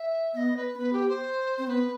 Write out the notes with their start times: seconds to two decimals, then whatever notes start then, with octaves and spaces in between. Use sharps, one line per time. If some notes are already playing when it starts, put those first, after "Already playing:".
Already playing: E5
0.33 B3 D#5 E5
0.57 B4
0.75 C4
0.78 B3 B4
0.93 G4
1.09 C5
1.58 C4
1.67 B3 B4